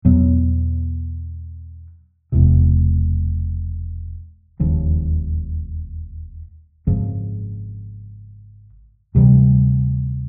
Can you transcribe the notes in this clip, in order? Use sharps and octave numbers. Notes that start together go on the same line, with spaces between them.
E2 B2 F#3 B3
E1 E2 C3
E1 D#2 C#3 F3
G#1 F#2 C#3 F3
D2 C3 E3 G3